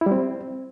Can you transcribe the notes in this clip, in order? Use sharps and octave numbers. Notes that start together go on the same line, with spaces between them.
E4
G3
C4